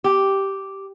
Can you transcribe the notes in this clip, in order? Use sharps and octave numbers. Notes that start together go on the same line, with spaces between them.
G4